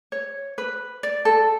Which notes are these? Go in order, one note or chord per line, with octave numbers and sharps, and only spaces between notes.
C#5
B4
D5
A4